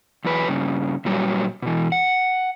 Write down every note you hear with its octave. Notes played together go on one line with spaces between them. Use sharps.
E2 F#3 B4
G2 C#3
A#2 F#3 G3
B2 E3
F#5